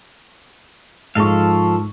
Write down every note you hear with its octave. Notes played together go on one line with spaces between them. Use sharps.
G#2 F3 G#3 A4 F5 C#6